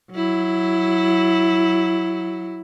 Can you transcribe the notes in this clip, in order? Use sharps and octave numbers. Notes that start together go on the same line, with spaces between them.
F#3 E4